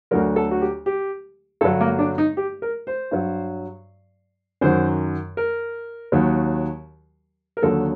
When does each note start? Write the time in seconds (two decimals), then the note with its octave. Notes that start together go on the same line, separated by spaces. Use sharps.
0.11 D2 D3 F#3 A#4
0.36 A4
0.51 F#4
0.61 G4
0.86 G4
1.61 G2 D3 F#3 A4
1.81 A#3
1.99 D4
2.18 D#4
2.37 G4
2.62 A#4
2.87 C5
3.11 G2 F#3
4.61 F#2 D#3 F#3 C5
5.37 A#4
6.12 D#2 D#3 F#3
7.57 A#4
7.62 D#2 D3 F#3 A4